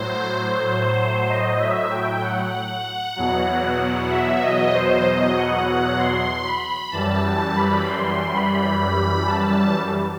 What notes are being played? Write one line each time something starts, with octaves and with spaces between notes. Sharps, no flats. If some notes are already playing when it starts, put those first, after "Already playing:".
Already playing: A2 F#3 C5
D#5
E5
G5
F#5
E2 B2 F#3
E5
D#5
C5
D#5
F#5
F#5
C6
B5
F#2 E3 G3 A5
A5
B5
C6
B5
B5
A5